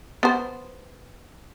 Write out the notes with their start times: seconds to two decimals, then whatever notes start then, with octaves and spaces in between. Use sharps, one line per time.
0.23 B3 C5